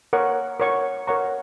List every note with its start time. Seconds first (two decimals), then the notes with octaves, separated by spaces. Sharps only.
0.13 A#4 C#5 F#5 C#6
0.60 A#4 C#5 F#5 C#6
1.07 A#4 C#5 F#5 A#5 C#6